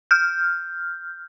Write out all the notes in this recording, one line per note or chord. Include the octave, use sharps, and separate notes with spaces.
F6 G6